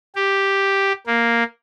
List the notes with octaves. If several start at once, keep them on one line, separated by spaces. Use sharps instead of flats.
G4
A#3